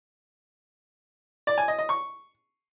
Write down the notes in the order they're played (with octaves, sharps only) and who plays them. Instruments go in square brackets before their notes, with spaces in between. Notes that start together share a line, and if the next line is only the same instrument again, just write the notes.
[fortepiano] D5
G#5
D#5
D#5
C#6